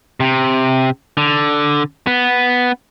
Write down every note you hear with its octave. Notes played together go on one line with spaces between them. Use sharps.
C3
D3
B3